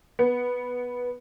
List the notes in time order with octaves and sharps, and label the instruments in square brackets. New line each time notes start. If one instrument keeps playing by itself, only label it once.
[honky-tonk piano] B3